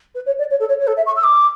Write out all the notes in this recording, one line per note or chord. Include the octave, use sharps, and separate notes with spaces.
B4
C#5
D5
C#5
A4
C#5
C#5
A4
E5
C#6
E6
D6